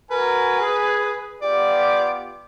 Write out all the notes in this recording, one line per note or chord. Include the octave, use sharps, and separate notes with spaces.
F#4 A#4 B4 G#5
G#4
B3 F4 G4 D5